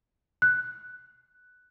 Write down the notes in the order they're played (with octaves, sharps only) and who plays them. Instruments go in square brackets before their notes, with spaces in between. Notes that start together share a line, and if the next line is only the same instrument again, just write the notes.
[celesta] F#6